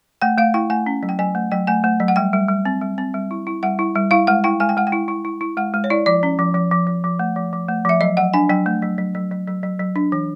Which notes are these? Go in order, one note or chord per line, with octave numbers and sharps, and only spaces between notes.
A3 G5
A3 F5
E4 G5
A3 G#5
C#4
F#3
G5
F#3 G#5
A3
F#3 G5
A3 G#5
A3
F#3
F#5
G3 G5
G3
G3
C4
G3
C4
G3
E4
E4
G3 F#5
E4
G3
E4 F5
G#3 F#5
E4 G5
G#3 G#5
G5
G#3 F#5
G5
E4
E4
E4
E4
G#3 F#5
G#3
C#5
E4 D5
F3 D5
C#4
F3
F3
F3
F3
F3
A3
F3
F3
A3
F3 E5
F#3 D#5
F#3 F#5
D4 G#5
F#3 G5
A3
F#3
F#3
F#3
F#3
F#3
F#3
F#3
D4
E3